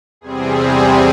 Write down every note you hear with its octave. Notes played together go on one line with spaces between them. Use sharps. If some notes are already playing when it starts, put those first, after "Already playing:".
E2 C3 G3 C4 G#4